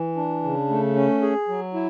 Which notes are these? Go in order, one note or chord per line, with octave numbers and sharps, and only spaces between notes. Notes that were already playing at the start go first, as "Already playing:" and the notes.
Already playing: E3
D4
C#3
A3
C#4
G#4
F#3
E4